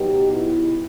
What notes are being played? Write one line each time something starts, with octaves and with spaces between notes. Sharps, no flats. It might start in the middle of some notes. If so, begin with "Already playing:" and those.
Already playing: B2 F#3 B3 D#4 G4
E4